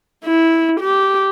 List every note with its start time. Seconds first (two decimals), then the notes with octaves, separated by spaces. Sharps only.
0.25 E4
0.80 G4